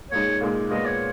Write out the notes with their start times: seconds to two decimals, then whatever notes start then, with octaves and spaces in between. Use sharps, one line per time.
0.11 A#2 G#3 D#4 C#5
0.41 A#2 G#3 D#4
0.70 A#2 G#3 B3 D#5
0.85 C#5